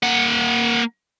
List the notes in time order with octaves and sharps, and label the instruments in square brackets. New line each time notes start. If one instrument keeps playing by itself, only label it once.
[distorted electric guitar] A#3 F#5